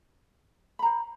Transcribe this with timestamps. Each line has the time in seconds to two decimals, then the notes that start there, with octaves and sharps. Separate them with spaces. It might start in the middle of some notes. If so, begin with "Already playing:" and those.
0.79 B5
0.82 A#5
0.86 C5